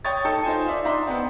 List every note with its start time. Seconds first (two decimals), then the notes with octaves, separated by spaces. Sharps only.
0.05 C#5 G5 C#6 D#6 A6
0.25 D#4 A4 G5
0.44 D#4 F4 C5 G#5
0.66 D5 E5 F5
0.85 D4 D#4 D5 E5 A#5 C6
1.07 B3 C4